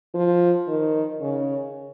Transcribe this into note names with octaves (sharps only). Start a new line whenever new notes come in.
F3
D#3
C#3